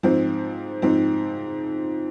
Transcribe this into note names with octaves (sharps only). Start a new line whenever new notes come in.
G#2 F3 C4
G#2 F3 C4